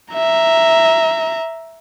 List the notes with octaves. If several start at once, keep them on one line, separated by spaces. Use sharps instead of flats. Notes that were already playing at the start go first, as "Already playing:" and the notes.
E5 A#5